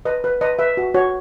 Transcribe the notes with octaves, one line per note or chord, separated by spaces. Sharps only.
B4 D#5
B4
B4 D#5
B4 E5
F#4
F#4 C#5